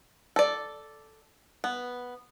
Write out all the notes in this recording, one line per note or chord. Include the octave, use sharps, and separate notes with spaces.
A4 D5
B3